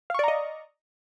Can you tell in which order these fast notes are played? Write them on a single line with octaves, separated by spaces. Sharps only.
F5 C#6 D5 A#5 D#5